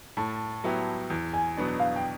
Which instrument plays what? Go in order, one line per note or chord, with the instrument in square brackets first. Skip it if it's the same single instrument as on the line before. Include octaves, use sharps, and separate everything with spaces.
[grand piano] A2 [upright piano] A5
[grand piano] F#3 B3 E4 G4
E2
[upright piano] G#5
[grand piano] B2 F#3 B3 D4
[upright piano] F5
G5